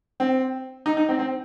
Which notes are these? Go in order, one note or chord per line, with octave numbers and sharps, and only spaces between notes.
C4
D#4
D#4
C4
C4